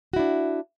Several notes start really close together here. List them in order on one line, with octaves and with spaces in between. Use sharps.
F#4 E4 D4